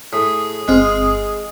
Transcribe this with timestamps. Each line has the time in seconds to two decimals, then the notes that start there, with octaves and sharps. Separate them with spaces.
0.13 A2 G#4
0.68 G1 G#3 C4 F4